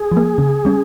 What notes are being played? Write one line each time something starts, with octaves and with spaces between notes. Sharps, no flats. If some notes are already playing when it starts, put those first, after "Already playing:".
Already playing: G#4
F3
A#3
C#3
G3 C#4